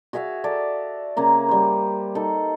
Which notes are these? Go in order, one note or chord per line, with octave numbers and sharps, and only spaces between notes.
F#4 G#4 E5 F5
A4 D5
C#3 A#3 A#5
G3 C5
D#4 A4